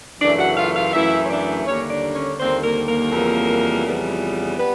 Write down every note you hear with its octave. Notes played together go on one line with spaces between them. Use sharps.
F#2 C#3 E3 A3 D4 D5
F#4 F#5
F4 F5
F4 F5
F#2 C#3 E3 A3 E4 E5
C#5
D4 D5
D#2 D3 G3 A#3 C#4 C#5
D4 D5
C#4 C#5
D#2 D3 G3 A#3 C4 C5
A#3 A#4
A#3 A#4
F2 C#3 E3 G3 B3
F2 C#3 E3 G3 B3
G3 B3 B4